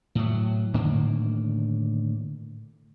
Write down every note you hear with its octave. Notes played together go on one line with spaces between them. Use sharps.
A2 F#3
A2 D3 D#3 A#3